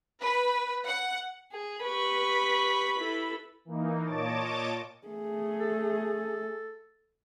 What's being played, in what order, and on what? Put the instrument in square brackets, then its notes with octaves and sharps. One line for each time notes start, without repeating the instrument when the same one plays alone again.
[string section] B4
F#5
[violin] G#4
[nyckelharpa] G4 C#6 [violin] B4 B5
[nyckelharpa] E4 A4
[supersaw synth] E3 A#3 D#4
A#2 C#5 D#5 A5 D6 A6
[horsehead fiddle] A3 G#4
[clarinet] A4